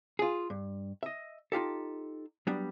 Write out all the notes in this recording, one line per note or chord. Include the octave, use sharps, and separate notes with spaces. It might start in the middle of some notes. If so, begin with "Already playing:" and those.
F4 G#4
G2
D#5 E5
D#4 F4 G4 A4
F#3 G3 B3 D4